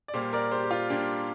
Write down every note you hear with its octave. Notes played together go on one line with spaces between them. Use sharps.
D5
A#2 G3 A#3 G4 C5
A#4 D5
G4 C5
G4
F4
A#2 G3 A#3 D4 G4